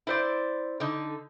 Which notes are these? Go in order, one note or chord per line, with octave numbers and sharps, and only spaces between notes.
E4 C5 D5
D3 D#4